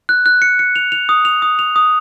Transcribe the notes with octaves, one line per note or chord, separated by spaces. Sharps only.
F#6
F#6
C#7
C#7
F7
F7
D#6
F7
D#6
F7
D#6